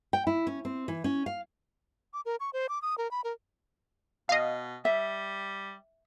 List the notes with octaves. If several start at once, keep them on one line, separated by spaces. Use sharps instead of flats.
G5
E4
C#4
C4
E3
C#4
F5
D6
A#4
C#6
C5
D6
D#6
A#4
B5
A#4
B2 D#5 F5
G3 E5